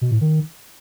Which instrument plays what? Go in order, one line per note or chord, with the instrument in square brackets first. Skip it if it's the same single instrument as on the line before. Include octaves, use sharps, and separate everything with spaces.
[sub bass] B2
A2
D#3